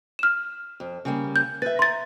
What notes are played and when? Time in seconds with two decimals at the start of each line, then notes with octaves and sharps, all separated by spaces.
0.19 F6 E7
0.80 F2
1.05 C#3 G3 A#3
1.36 G6
1.62 B4 E5 A6
1.79 A#5 C6 A6